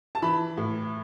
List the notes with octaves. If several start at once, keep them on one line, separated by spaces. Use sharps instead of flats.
A5
E3 B5
A2